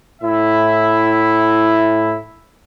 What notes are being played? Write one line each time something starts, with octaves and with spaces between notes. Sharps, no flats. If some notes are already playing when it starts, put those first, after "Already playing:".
A2 E4 E5